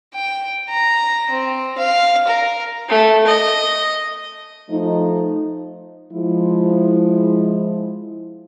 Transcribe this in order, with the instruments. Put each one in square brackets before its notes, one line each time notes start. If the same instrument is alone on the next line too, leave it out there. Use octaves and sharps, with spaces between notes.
[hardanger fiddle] G5
A#5
C4
F5
A#4
[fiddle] A3
D#5
[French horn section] F3 A3 D#4
F3 G#3 E4